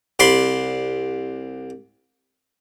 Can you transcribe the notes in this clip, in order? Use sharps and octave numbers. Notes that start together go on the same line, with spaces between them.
C2 D5 B5 C6